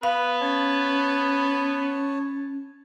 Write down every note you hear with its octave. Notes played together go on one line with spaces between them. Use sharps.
B3 B4 F5
C#4 C#5 A5